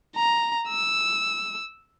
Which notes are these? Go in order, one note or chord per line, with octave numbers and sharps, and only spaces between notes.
A#5
E6